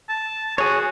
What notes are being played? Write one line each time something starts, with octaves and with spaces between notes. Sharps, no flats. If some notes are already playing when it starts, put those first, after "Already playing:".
A5
F#4 G#4 C#5